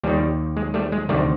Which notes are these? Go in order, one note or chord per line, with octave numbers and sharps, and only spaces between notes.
D#2 D#3 G3
G#3
G3 A3
G#3
D2 C3 D#3 G3 A3